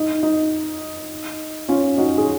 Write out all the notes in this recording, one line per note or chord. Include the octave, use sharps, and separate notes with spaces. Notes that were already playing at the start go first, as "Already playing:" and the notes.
Already playing: D#4
D#4
C#4 F4
D#4 F#4
G#4